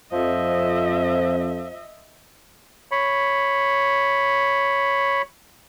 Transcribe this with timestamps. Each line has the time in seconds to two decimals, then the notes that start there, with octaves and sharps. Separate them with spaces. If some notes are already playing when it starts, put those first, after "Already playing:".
0.12 F2 F3 D#5 E5
2.91 C#5 B5